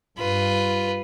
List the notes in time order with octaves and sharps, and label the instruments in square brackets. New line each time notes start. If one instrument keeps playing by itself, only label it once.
[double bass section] G2 [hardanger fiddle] F4 B4